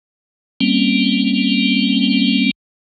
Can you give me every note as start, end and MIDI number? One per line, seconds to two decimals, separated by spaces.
0.61 2.51 55
0.61 2.51 58
0.61 2.51 60
0.61 2.51 61